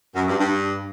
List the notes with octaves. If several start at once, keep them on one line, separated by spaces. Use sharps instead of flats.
F#2
G2
G2